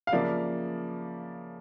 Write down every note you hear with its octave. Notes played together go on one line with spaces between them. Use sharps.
F5
C#3 F3 A#3 D5 E5